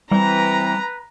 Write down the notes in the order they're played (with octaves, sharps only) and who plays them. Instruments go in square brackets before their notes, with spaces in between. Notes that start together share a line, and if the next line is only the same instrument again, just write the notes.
[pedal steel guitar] E3 C4 [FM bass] G3 [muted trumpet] B4 [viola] A#5